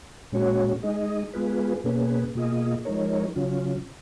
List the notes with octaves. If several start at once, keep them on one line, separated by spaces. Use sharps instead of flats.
A#2 G#3 C#4 F#4 C#5
G#3 D#4 G#4 D#5
G#3 B3 F4 G#4 B4
B2 A#3 C#4 G#4 B4
B2 A#3 F4 G#4 D#5
F3 G#3 D#4 A#4 C#5
C#3 F#3 C#4 F4